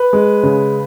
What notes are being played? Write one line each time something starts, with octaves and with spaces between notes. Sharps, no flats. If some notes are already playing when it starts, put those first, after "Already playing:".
Already playing: B4
G#3
C#3